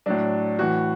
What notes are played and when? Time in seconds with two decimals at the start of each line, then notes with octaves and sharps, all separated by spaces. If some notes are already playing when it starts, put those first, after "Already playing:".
0.06 A2 F#3 D4
0.59 A2 E3 F#4